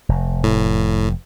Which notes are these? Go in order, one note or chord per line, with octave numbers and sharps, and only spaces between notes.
F1
A2